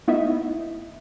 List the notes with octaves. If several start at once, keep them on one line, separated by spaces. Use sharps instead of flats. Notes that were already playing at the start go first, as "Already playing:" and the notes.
A3 B3 D#4 E4 D#5 E5